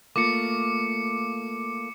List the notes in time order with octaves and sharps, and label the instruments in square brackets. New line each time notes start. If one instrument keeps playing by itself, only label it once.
[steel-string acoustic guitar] A3 A#3 F4 [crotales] D6 C#7